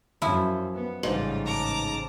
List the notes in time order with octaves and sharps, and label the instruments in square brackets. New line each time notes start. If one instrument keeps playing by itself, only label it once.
[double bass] F#2 [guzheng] F3 E4
[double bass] B3
[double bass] A1 C#3 [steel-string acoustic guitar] G#2 [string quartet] G3 F4
[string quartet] A5 A#5 D6